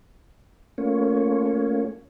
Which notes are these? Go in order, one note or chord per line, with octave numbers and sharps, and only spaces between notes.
A3 A#3 C#4 F4 C#5